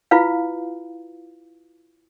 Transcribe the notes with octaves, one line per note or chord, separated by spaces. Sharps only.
E4 F4 B4 F5